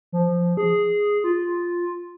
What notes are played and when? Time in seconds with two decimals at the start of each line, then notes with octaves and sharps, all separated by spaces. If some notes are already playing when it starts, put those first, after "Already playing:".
0.12 F3
0.57 G#4
1.24 F4